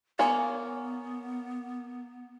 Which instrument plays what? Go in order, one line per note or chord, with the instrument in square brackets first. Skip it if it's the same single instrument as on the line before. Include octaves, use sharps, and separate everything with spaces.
[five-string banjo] A#3 C#5 G#5 [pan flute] B3